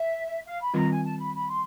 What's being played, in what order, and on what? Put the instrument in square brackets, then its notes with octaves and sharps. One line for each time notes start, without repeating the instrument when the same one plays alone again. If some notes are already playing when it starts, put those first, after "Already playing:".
Already playing: [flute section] E5
F5
B5
[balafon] D#3 G3 C4 F4 [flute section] A#5
[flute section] G#5
A5
B5
B5
C6